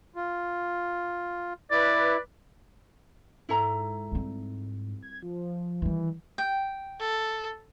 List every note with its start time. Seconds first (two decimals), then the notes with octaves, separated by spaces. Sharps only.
0.16 F4
1.72 E4 B4 D5
3.49 G#2 E4 A4 A#5
4.12 G3 C4
5.03 G#6
5.23 F3
5.82 D#3 E3 G3
6.38 G5
7.01 A4